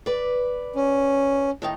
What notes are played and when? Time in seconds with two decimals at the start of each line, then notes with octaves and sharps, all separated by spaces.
0.06 B4 D5
0.75 C#4
1.62 A2 D#3 D#4